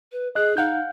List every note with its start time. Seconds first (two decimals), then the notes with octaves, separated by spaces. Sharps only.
0.12 B4
0.35 G#4 D#5 F#6
0.57 D#4 F5 F#5 G6